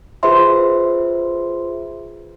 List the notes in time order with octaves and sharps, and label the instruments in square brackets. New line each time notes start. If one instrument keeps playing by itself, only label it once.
[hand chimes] F4 G#4 B4 C5 E5 C6